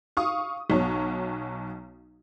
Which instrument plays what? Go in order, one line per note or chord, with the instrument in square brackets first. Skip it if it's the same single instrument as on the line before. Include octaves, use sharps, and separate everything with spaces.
[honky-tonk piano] F5 C#6 D#6
B1 B2 F#3 C#5